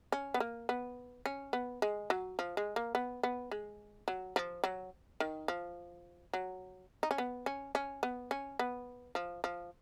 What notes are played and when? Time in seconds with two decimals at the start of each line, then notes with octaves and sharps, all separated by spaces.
0.12 C#4
0.34 B3
0.40 A#3
0.69 B3
1.26 C#4
1.53 B3
1.82 G#3
2.10 F#3
2.39 F3
2.57 G#3
2.76 A#3
2.95 B3
3.23 B3
3.51 G#3
4.08 F#3
4.36 F3
4.64 F#3
5.20 D#3
5.48 F3
6.34 F#3
7.03 D#4
7.11 C#4
7.18 B3
7.46 C#4
7.75 C#4
8.03 B3
8.31 C#4
8.59 B3
9.15 F3
9.44 F3